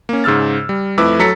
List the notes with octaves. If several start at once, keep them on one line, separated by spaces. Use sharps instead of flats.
A#3 C#4
G#2 C#3 E6 F6 A6
G3
F2 A3 E4 B4 D6 E6
F#3 A4 A#5 A6 B6 C#7